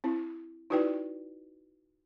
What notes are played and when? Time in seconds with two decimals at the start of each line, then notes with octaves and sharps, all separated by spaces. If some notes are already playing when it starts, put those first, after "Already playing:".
0.04 C4 E4
0.70 D#4 E4 F#4 B4 D5 G5